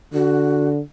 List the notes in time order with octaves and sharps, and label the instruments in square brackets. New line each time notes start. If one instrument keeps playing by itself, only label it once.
[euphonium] D3 [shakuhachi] F#4